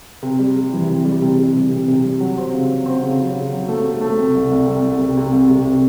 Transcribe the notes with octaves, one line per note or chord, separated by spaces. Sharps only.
C3
G3
G3
E3
C3
G3
C3
G3
C3
C3
C3
G3
F#3
C4
C#3
C4
C4
C#3
F#3
C#3
F#3
A3
A3
A3
C3
C2
C2
C3
C2
C3
C3
C2
C3
C3